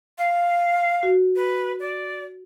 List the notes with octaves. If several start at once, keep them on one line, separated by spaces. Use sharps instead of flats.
F5
F#4
B4
D5